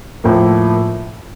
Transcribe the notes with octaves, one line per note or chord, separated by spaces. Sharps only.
A2 F3 A#3